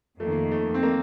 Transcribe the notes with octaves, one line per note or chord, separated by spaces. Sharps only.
F2 D#3 A3 A#3
A3
C4
A#3